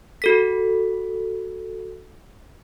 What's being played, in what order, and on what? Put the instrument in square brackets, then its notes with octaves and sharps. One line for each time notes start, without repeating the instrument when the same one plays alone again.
[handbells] F#4 A4 B6